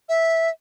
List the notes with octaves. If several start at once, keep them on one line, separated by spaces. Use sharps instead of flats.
E5